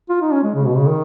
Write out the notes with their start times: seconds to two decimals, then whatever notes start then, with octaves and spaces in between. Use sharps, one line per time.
0.09 F4
0.21 D#4
0.32 C#4
0.43 G#3
0.55 C#3
0.66 B2
0.77 C#3
0.88 D#3